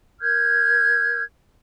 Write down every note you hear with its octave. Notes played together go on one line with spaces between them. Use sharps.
A#4 F6 G6 G#6